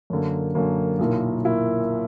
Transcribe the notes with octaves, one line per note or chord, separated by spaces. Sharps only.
F#2 D3 A#3
F#2 D3 A#3
B1 A#2 A#3 E4 A#4
A#2 E4